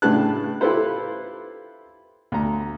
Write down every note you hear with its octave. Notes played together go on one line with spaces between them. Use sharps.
A2 C#3 D4 B4 A5 F#6
E4 F4 G4 A4 B4 C5
D2 A#5